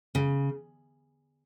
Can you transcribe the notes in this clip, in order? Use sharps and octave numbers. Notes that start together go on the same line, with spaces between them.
C#3